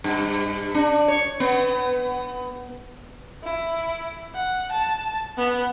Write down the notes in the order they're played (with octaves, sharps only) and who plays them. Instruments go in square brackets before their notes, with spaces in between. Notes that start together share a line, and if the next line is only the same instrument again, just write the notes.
[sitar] G2
D4
C#5
B3
[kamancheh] E4
F#5
A5
B3